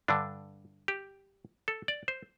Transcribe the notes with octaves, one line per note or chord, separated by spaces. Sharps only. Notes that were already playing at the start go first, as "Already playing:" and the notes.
G2 D3 D4
G4
A4
D5
C5